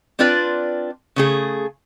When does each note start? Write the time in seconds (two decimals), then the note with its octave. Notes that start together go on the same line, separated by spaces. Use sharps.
0.19 C4 D4 F4 B4 D5
1.16 C#3 A3 G#4